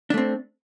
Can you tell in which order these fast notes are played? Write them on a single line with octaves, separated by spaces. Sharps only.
D4 A3 C4